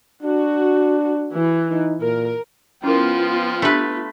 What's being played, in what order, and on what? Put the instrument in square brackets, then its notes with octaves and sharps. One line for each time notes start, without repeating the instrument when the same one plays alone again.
[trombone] D4 [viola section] F#4
[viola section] E3
[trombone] D#4
[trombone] A#2 [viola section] A#4
[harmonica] F3 G5 [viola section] B3 F4 [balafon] C#4 E4 A#4
[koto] A3 B4 [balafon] D4 G4